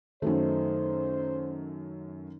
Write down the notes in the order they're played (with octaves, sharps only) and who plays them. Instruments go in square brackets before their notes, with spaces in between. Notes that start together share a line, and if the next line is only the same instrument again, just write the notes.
[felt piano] F#2 F#3 A3 [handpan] D#3 D#4 [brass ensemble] C5